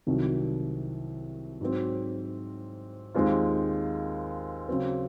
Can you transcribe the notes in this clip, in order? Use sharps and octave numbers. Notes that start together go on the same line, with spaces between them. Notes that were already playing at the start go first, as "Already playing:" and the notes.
C2 C3 D#3 F#3
G#2 F#3 C4
D#2 D#3 G#3 C4 F4
C#3 F#3 C4